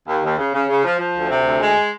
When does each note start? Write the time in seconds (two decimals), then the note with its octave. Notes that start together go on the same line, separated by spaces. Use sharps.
0.08 D#2
0.24 D#2
0.38 C#3
0.54 C#3
0.69 C#3
0.85 F3
0.99 F3
1.15 D2
1.30 C3
1.45 D2
1.61 G#3